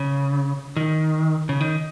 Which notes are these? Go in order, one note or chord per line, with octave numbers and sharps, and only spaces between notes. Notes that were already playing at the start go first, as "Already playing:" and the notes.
Already playing: C#3
D#3
C#3
D#3